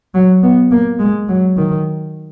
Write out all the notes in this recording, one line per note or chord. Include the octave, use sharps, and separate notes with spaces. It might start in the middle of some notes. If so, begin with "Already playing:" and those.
F#3
B3
A#3
G#3
F#3
D#3